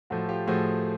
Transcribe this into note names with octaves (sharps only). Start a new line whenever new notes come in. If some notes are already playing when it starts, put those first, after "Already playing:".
A2 F3 A3 F#4
F4 G4
A2 F3 A3 F#4 G#4